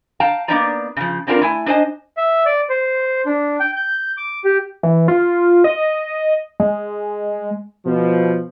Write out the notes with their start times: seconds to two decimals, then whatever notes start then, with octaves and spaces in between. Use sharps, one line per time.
0.20 F5 G5 A5 A#5
0.48 A#3 B3 D4 D#4 D5 A#5
0.97 C#3 F3
1.27 B3 C4 D4 F4 G4 A#4
1.41 A3 E4 G#5
1.66 D4 D#4 C5 D#5 G#5
2.17 E5
2.46 D5
2.69 C5
3.26 D4
3.60 G5
3.76 G6
4.17 D6
4.44 G4
4.83 E3
5.08 F4
5.64 D#5
6.60 G#3
7.86 B2 F3